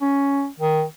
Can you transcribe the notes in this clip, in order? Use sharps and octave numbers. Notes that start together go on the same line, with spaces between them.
C#4
D#3